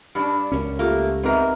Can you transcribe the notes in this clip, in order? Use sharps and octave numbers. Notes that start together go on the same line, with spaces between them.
G2 G3 D4
C#2 F#2 C#4
A3 A#3 F4 G4
G#2 B3 C4 A#4 E5